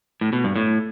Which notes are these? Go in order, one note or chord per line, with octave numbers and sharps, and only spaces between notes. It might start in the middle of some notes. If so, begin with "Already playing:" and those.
A2
B2
G2
A2